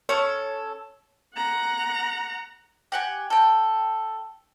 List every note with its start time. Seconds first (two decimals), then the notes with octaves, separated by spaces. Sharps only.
0.09 C#4 A4 C#5 C#6
1.36 F#5 A#5
2.92 G4 F#5 G#5
3.30 A4 G5